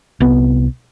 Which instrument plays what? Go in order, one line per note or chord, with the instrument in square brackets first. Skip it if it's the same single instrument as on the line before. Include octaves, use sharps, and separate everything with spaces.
[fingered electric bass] C2 B3